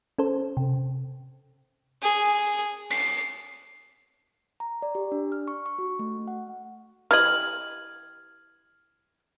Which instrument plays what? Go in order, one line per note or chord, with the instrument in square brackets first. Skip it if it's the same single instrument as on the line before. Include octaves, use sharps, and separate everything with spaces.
[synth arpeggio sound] C#4 A4 C5
C3
[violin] G#4
C7
[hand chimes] A#5
D5
G4
D4
F6
C#6
C#6
F#4
A3
F#5
[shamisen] E3 G4 D#5 [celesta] F6 G#6 F#7